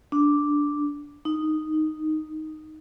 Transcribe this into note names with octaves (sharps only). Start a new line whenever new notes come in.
D4
D#4